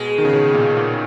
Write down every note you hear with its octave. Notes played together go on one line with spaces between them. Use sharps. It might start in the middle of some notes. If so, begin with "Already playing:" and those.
Already playing: B2 G#3
D#3
C#3
B2
A#2
A#2